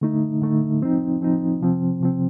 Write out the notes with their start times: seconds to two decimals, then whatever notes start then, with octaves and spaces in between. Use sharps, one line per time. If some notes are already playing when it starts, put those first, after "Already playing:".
0.01 D3 A3 D#4
0.41 D3 A3 D#4
0.81 F3 C4 D#4
1.21 F3 C4 D#4
1.60 C3 F3 C4
2.00 C3 F3 C4